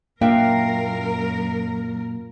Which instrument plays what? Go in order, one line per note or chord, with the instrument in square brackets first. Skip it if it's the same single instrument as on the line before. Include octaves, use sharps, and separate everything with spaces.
[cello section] F#2 A#4 [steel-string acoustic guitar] A#2 [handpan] A#3 F5 [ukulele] D4 E5 G5